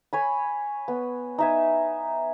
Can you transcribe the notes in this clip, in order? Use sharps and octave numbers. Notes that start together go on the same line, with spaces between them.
C#5 G#5 B5
B3
D#4 E5 G#5